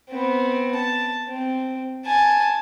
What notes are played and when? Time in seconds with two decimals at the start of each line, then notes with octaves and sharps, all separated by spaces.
0.10 B3 C4
0.75 A5
1.27 C4
2.06 G#5 A5